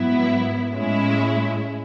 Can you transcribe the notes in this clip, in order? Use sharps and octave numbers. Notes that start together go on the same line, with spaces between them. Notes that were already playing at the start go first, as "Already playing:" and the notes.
Already playing: G#2 F#3 B3 E4
A2 G#3 C#4 E4